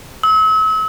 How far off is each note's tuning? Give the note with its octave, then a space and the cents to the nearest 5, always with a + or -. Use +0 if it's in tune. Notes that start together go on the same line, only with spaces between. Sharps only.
E6 -40